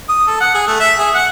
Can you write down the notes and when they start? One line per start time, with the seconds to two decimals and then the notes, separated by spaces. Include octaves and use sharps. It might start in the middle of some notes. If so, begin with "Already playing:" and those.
0.09 D#6
0.27 A4
0.40 F#5
0.54 G#4
0.67 A3
0.80 E5
0.99 G#4
1.14 F#5